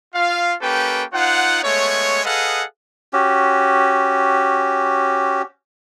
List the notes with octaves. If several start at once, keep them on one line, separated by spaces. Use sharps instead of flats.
F4 F5
A#3 C#4 G4 A4 B4 G5
D#4 F4 C5 F#5
G#3 A3 B3 C#5
G#4 A4 B4 D#5 F5 F#5
C#4 F#4 G4